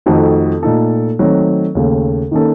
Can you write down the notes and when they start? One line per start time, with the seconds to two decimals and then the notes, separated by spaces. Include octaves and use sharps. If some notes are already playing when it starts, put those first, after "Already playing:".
0.06 F2 D#3 A3 C4 F#4
0.63 A#2 A3 D#4 A4
1.19 D#3 F#3 A3 C4
1.75 D#2 C#3 A3
2.31 D#3 A#3 C#4 A4